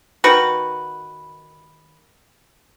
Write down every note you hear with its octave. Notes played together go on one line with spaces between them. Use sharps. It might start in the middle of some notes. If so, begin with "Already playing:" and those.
D#3 F#4 B4